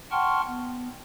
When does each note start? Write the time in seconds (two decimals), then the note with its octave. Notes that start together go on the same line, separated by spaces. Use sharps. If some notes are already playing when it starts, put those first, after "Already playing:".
0.11 F#5 G5 A5 C6 C#6 F6
0.47 B3